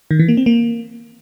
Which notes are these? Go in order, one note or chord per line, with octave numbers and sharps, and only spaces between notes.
D#3
E3
A#3
C4
A#3